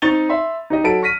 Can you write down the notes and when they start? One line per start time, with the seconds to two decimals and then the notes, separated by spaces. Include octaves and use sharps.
0.02 C4 D#4 C#6 A6 F7 G7
0.29 E5 B5 C6
0.70 D#4 G4 D#5
0.84 F#3 A4 A5 B5 D7
1.02 C#6 F6 A#6 B6 D#7